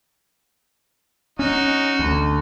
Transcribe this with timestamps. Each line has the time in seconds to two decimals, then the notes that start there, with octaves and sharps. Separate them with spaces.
1.39 C#4 D#4 F#4
1.99 D2